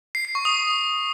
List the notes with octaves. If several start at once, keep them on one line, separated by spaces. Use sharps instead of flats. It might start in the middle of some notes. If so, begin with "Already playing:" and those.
C7
C7
C#6
D#6